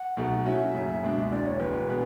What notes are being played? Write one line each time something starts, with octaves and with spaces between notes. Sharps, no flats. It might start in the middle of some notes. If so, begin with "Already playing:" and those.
Already playing: F#5
B1 B2 A3
A2 F#3 C#4 F#4 E5
F#1 F#2 C#3
C#2 B2 G#3 D4
E1 E2 D3 D5
C#5
E1 E2 D3 B4
B2 G#3 B3